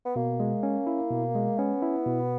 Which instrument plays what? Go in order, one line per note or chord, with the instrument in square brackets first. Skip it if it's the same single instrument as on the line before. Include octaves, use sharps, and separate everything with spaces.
[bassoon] B3
[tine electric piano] B2 [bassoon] A#3
[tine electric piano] G#3
C#4
E4
B2
G#3
[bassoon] B3 [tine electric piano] C#4
[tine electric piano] E4
B2